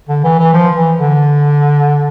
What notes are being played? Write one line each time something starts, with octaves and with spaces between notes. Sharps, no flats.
D3
E3
E3
F3
E3
D3